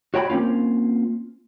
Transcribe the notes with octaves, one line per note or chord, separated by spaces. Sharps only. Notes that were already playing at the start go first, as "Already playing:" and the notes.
F#4 C#5 G5 A5 B5
A#3 C4 C#4 F4